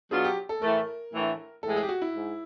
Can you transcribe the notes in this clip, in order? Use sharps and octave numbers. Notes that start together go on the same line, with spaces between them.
B2 F#3 B3 D4 F4 G#4
G4
A4
A2 E3 A3 A#4
A2 E3 A3 D4
A2 E3 G#3 A4
G#4
G4
F#4
E4
G#2